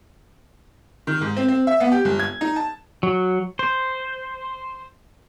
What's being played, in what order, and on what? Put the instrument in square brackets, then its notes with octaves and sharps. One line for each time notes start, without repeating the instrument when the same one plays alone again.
[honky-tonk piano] D#3
G#2
C4
C4
E5
B3
G4
G1
G#6
D#4
A5
[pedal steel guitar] F#3
C5